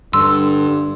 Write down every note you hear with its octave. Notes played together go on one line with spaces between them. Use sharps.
G2 D3 C6 E6